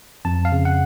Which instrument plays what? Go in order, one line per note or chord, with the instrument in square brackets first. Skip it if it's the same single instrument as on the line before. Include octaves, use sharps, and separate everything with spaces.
[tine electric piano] F2 A5
F5
C#3
F#5